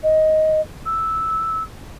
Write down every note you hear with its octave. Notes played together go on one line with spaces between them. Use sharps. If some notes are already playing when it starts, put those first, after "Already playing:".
D#5
E6